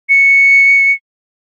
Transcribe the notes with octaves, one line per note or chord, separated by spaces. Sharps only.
C#7